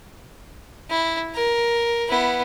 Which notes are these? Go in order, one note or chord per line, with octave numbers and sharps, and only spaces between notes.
E4
A#4
B3 E4